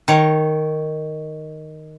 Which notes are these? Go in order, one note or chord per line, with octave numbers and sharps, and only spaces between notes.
D#3 C#5